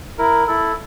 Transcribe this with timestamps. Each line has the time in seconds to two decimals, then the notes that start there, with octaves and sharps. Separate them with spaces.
0.18 E4 A#4
0.47 E4 A4